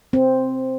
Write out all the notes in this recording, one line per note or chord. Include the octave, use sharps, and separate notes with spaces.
C4